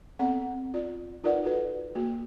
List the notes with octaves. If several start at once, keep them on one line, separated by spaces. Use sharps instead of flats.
B3 C4 A4 F#5
F4 D5
D#4 F4 A#4 B4 D5 F#5
F#4 A4 B4
A#3 F#4